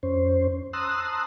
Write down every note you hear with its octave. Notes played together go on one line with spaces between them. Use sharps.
F2 C#4 C5
A5 A#5 C6 D#6 E6 F#6